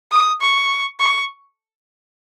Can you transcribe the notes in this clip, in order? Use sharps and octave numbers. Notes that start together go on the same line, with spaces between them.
D#6
C#6
C#6